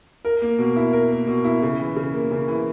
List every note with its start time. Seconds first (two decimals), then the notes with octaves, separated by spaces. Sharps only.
0.25 A#4
0.42 A#3
0.58 B2
0.76 E4
0.93 A#4
1.11 A#3
1.27 B2
1.44 E4
1.62 C#3
1.80 E3
1.96 C#3
2.14 A#3
2.31 C#3
2.48 E3